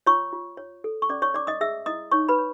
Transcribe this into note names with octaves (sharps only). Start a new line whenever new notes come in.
F4 C#5 C#6
F4
C#5
A4
C#6
C#4 D5 D6
C#5 C#6
C#5 D5 D6
D#5 D#6
G#4 E5 E6
E4 D#5 D#6
D#4 C#5 C#6
B4 B5
C#5